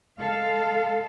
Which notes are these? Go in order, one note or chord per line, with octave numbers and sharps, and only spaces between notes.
G#3 A4 F5